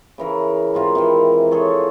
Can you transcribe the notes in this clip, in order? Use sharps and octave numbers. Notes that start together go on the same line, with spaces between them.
C#3 E3 A#4
G#2 C3 F4 A#4
C3 D#3 E3
F4 G#4 A4 C#5